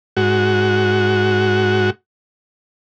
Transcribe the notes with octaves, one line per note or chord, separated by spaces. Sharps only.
G#2 F#4